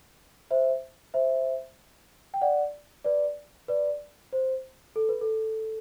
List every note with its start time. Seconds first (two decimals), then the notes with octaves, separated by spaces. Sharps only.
0.51 C5 E5
1.14 C5 E5
2.34 G5
2.41 D5 F#5
3.05 B4 D5
3.68 B4 D5
4.33 C5
4.96 A4
5.09 B4
5.21 A4